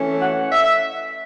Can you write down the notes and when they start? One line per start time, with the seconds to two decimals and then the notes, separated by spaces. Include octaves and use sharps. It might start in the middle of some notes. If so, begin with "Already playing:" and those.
Already playing: E3 A3 C#4
0.20 F#5
0.51 E5